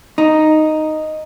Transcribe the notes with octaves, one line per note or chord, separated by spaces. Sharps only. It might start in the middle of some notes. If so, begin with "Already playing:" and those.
D#4